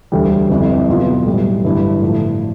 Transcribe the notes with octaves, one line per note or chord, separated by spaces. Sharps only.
E1 D2 D3 G3
G1 F2 E3
B1 B2 B3 F4
B1 A2 G3
G1 G2 E3 A3 E4
A2 F3 A3